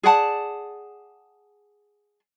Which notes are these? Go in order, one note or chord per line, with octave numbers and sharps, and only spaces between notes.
G#4 D5 F#5 A5